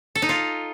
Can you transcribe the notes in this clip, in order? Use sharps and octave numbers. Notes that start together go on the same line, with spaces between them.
A4
D#4
F4